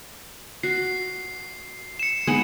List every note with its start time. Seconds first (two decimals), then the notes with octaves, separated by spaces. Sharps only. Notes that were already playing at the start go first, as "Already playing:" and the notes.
0.63 F#4 C7
1.99 C#7 E7
2.27 G#3 B3 D#4